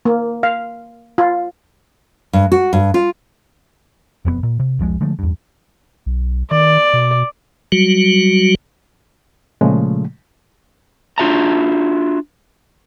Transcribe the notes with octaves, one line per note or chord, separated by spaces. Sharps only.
A#3
F5
F4
G2
F#4
G2
F4
E1 F2 G3 B3
A#2
C3
E1 B1 F3 G#3
D3 F3 G#3 A3
E2 G2
B1
D#3 D5
B2
F#3 G3 F#4
A#2 C#3 F3 G#3 A3
D4 F4 F#4 E5 A5 A#5